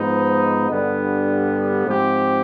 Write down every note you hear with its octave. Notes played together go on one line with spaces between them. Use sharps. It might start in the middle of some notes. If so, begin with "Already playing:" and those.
Already playing: G#2 F3 B3 D#4
G2 D3 G3 B3
G#2 F3 C4 G4